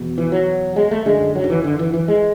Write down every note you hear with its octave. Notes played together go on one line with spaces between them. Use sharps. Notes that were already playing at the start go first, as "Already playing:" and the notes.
Already playing: E2 B2
E3
F#3
G#3
A3
F#2 D3 G#3
F#3
D3
E3
D3
E3
E3
G#3